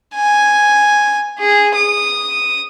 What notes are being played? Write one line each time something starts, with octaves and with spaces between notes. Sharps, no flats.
G#5
G#4
D#6